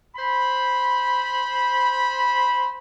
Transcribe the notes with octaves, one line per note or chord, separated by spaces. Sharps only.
C5 B5